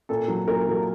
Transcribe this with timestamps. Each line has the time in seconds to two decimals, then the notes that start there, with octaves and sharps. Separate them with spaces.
0.09 A#2 A4
0.28 F#3
0.48 A#2 A#4
0.67 F#3